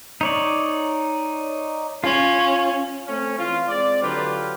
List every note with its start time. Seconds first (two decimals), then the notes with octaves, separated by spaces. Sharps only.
0.21 D#4 C#5 D5
2.04 C#4 F4
3.07 A3 C4 C#4
3.39 E3 C4 F4
3.69 G#3 C4 D5
4.02 D3 F#3 F4 G4 B4